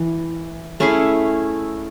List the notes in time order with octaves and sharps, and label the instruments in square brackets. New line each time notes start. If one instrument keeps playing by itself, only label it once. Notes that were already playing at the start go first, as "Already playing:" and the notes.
Already playing: [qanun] E3
A3 C#4 E4 G#4